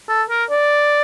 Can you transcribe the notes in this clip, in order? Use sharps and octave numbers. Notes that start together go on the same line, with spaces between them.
A4
A#4
D5